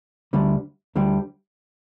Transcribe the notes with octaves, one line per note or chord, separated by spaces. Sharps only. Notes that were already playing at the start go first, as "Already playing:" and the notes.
D2 D3 G3
D2 D3 G3